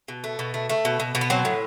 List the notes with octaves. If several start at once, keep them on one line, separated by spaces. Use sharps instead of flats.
B2
A3
B2
A3
A3
B2
B2
B2
B3
F#3 C4
A2